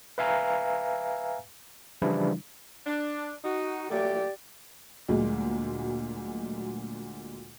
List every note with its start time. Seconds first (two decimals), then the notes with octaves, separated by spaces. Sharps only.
0.18 B4 E5 F5 G#5 A#5
2.02 C#3 E3 F3 G3 D4 E4
2.87 D4
3.45 D#4 F#4
3.90 A#2 F#3 A3 G4 D5
5.08 D2 A#2 F#3 G#3